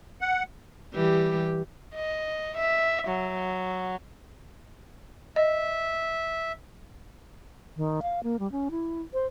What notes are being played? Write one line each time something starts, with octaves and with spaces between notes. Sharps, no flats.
F#5
E3 G3 G4
D#5
E5
F#3
D#5 E5
D#3
F5
A#3
G3
C#4
E4
C5